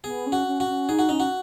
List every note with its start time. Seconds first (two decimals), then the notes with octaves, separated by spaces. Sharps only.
0.04 B3 G#4
0.26 C#4
0.32 F#4
0.46 C#4
0.60 F#4
0.67 C#4
0.88 D#4 G#4
0.99 F#4
1.09 C#4 D#4
1.20 F#4